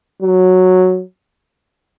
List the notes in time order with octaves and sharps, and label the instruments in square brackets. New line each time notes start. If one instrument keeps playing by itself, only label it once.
[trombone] F#3